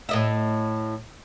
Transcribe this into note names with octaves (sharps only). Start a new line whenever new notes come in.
A2 D#5 E5